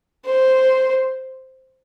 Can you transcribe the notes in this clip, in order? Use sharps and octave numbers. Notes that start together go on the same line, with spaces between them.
C5